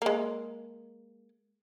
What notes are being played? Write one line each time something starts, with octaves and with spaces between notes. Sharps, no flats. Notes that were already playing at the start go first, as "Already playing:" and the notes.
G#3 A#3